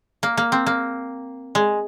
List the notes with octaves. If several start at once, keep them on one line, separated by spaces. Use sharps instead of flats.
A#3
A#3
C4
A#3
G#3